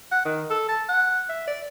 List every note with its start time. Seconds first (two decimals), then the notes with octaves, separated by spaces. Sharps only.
0.11 F#5
0.25 D#3
0.50 A4
0.69 A5
0.89 F#5
1.29 E5
1.47 D5